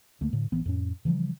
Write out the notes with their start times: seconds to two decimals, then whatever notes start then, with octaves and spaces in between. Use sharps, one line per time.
0.21 D2 A3 A#3
0.33 A2 D3
0.52 A1 E3 B3 C4
0.65 F2 A2 C#4
1.05 C#3 E3 F3 G3